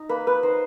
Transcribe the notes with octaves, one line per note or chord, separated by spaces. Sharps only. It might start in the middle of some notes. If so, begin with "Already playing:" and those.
Already playing: D#4
A#3 B4
B4
D#4 C5